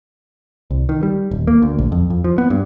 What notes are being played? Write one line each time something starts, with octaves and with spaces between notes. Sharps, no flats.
C2
D#3
G3
D#1
A#3
D2
A#1
F2
F2
F3
B3
G2